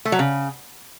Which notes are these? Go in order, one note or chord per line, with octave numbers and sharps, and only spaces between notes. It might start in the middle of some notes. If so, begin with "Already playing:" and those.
A3
F#3
C#3